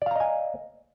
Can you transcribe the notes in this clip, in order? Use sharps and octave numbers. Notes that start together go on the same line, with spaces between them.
D5 D#5 F5 G#5 A#5